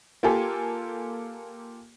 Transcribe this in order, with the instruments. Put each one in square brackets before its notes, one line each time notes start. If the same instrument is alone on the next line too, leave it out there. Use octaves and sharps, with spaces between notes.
[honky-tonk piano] A#3 F4 G4 A4 G#5